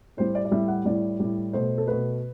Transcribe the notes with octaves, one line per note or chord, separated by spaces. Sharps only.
A2 G3 C5
D5
D5
A2 G3 E5
F#5
A2 G3 D5
A2 G3
B2 A3 C5
A4
B2 A3 B4